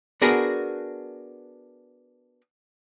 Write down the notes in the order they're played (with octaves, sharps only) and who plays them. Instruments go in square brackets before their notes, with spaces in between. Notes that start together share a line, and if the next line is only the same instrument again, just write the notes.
[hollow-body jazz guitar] B3 D4 F#4 G#4 A#4